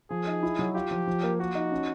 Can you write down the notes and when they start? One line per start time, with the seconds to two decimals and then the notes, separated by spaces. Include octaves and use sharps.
0.10 F3 G#4
0.27 D#4
0.43 E4
0.59 F#3
0.75 F4 G4
0.91 F3
1.07 F3
1.23 A#3
1.39 A#3 F#4
1.55 D#4
1.71 C#4